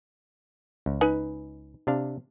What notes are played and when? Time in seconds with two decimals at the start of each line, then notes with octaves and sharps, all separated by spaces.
0.86 C#2
1.01 D#4 B4 G#5
1.87 C3 D4 F5